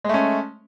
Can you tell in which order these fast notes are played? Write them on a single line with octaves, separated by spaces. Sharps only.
G#3 A3 C#4